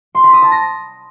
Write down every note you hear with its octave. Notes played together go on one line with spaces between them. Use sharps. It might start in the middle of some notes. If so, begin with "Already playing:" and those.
C6
B5
D#6
A5
A#6